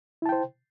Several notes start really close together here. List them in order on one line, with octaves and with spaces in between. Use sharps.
E4 A5 G5 C5